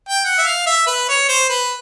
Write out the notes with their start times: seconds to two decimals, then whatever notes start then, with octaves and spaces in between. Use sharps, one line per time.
0.09 G5
0.25 F#5
0.39 E5
0.45 F5
0.66 E5
0.87 B4
1.09 C#5
1.29 C5
1.50 B4